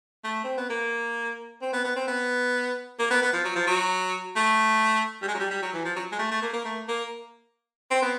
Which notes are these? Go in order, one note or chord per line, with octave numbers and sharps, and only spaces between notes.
A3
C4
B3
A#3
C4
B3
B3
C4
B3
A#3
B3
B3
F3
F#3
F3
F#3
A3
G3
G#3
F#3
G3
G3
F#3
E3
F3
F#3
G#3
A3
A3
A#3
A#3
A3
A#3
C4
B3